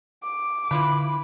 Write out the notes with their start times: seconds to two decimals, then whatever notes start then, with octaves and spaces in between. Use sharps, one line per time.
0.23 D6
0.71 D3 E4 F4 B4